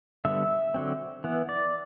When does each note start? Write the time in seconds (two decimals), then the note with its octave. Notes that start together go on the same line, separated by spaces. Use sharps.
0.25 D3 G3 B3 E5
0.74 D3 F#3 C4
1.24 E3 B3
1.49 D5